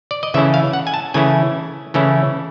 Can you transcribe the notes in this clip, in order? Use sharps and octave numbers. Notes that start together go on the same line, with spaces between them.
D5
D#5
C#3 E3 A3 C#4 E4 E5
F5
F#5
G#5
A5
C#3 E3 A3 C#4 E4 G#5
C#3 E3 A3 C#4 E4